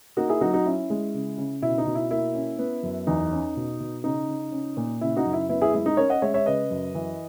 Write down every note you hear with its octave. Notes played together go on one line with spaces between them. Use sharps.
A#3 D#4 F#4
E4 G#4
F#3 D#4 F#4
D#4 F#4
C#4 E4
G#3
C#3
C#3
B2 E4
D#4
B2
E4
A#3 E4
C#4
B3
F#2
E2 D#4
C#4
B2
B2
C#3 D#4
C#3
C#4
A#2
C#3 E4
D#4 F#4
F#2
E4
B3 E4
E4 G#4
G#3 E4
D#4
C#4 A#4 C#5
D#5 F#5
G#3 C#5 E5
C#5 E5
C#3 B4 D#5
F#2
E3